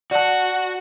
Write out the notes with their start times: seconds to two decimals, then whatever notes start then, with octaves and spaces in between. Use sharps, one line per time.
0.11 F#4 D5 F#5 A5